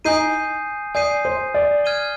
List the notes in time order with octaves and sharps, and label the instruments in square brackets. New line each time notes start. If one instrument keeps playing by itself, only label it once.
[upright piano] D#4 [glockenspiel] G#5 D#6 G6 C7 D#7
[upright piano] D5 [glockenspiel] G#5 D#6 G6 C7 D#7
[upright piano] C5
D5
[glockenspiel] F6 G#6 D#7 G7